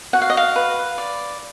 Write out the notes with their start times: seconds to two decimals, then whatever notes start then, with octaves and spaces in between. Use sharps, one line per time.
0.13 F#4 F#5
0.22 F5
0.30 D#5
0.37 F5
0.56 B4
0.98 D5